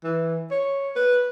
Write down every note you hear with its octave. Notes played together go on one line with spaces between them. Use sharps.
E3
C#5
B4